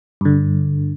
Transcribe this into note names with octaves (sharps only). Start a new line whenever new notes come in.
G2 D3